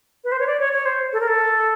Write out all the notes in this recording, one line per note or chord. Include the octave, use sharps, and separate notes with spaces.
B4
C5
C#5
D5
C#5
C#5
C5
A4
A#4
A4